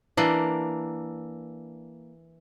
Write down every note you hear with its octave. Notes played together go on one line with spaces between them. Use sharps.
E3 A#3 D4